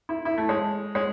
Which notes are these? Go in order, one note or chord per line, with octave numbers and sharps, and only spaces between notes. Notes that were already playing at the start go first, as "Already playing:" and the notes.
E4
E4
A3
G#3
G#3